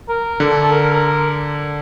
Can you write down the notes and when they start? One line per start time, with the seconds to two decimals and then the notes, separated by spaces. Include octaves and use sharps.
0.09 A#4
0.40 D3
0.51 A4
0.61 A4
0.71 A#4
0.82 A#4
0.93 A#4